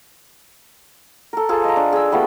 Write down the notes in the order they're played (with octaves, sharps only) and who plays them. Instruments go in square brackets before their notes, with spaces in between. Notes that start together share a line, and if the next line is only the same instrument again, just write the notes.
[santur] A4 A#4
F4 G#4 A4 C5
D#5 A#5
D4
G#4 E6
G3 A3 B3 F4